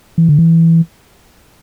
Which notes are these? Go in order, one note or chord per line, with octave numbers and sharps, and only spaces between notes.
E3
D3
E3